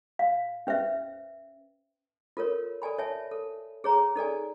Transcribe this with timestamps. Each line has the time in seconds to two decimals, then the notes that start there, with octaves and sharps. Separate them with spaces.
0.19 F5
0.67 C#4 B4 C5 E5
2.37 F4 A4 A#4 C#5
2.82 A4 D5 G#5 B5
2.98 C#5 E5 G#5 A5
3.31 A4
3.84 G#4 C#5 A#5
4.16 D#4 A4 D5 G#5